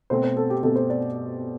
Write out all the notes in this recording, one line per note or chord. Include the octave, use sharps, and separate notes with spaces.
B2 A3 C4 C5
C5
A4
G4
B2 A3 C4 A4
C5
D5